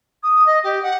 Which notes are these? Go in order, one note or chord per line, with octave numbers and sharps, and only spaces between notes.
D#6
D#5
G4
F#5